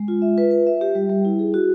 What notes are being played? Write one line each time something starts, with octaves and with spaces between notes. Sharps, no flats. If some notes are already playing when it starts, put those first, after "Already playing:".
Already playing: G#3
F4
E5
B4
B4
E5
G4
G3
G3
E4
G#4
F#4